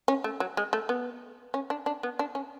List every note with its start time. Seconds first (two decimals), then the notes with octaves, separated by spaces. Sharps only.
0.08 C#4
0.24 A3
0.40 F#3
0.57 G#3
0.73 A3
0.89 B3
1.54 C#4
1.70 D4
1.86 D4
2.03 B3
2.19 D4
2.35 C#4